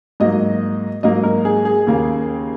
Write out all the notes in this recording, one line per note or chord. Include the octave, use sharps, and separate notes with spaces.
G#2 F#3 A#3 D#5
G#2 F#3 A#3 D#5
A#4
G#4
G#4
D#2 C#3 A#3